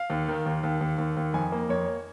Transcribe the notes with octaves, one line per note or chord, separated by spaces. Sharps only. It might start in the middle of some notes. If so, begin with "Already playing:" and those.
Already playing: F5
D#2
D#3
D#2
D#2
D#2
D#2
D#2
F2 G#5
A#3
F2 C#5